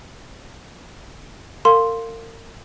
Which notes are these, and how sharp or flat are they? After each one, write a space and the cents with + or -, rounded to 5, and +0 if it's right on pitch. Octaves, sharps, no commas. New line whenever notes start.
A#4 -40 F5 +0 C6 +0